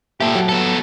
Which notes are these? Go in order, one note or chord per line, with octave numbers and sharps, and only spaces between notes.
A#2 G4 A4 E5
F#3
B3 A4